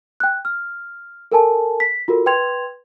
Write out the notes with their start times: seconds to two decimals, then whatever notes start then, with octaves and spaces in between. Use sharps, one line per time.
0.20 G5 F#6
0.45 F6
1.32 A4 A#4 G#5 A5
1.80 B6
2.08 F4 F#4 A4 A#4
2.26 B4 G5 C6 G#6 F7